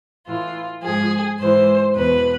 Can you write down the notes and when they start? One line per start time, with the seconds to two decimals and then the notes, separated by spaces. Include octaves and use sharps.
0.26 A2 E3 F4
0.82 G#2 F3 G#4
1.38 G#2 E3 C5
1.95 E2 B2 B4